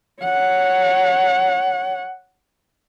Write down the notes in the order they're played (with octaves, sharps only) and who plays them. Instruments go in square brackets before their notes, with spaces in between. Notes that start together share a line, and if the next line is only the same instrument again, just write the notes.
[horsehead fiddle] C#5 F#5